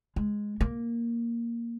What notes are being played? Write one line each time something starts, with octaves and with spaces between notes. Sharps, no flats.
G#3
A#3